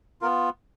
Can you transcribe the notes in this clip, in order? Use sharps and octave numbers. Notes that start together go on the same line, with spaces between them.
B3 F4 A#4